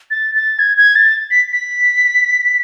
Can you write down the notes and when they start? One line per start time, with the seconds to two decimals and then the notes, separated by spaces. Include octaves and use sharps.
0.11 A6
0.35 A6
0.59 G#6
0.77 G#6
0.95 A6
1.31 B6
1.53 B6